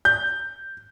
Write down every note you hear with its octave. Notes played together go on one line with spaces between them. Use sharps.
G6